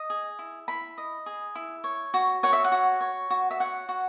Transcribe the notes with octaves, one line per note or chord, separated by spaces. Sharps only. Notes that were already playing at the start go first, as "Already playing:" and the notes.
Already playing: D#5
G#4
E4
E4 B5
D#5
G#4
E4
C#5
F#4
C#5 F#5
E5
F#5
F#4
C#5
F#4
E5
C#5 F#5
F#4